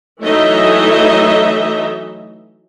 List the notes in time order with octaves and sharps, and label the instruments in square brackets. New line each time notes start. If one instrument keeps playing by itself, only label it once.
[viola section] E3 F#3 A3 D#4 D#5 E5